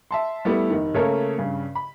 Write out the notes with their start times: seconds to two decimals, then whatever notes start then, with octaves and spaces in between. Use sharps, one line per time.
0.11 E5 A5 C6
0.45 G3 A3 B3 E4
0.70 F1 D#3
0.94 C#3 A3 A#3 A4 A#4 C#5
1.38 G2 C#3
1.75 B5